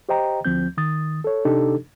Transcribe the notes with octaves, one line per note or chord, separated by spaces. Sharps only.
G4 C5 D#5 G5 A#5
D2 F3 C4 G6
D#3 D#6 A6
A4 C#5
C3 D4 D#4 G4 A4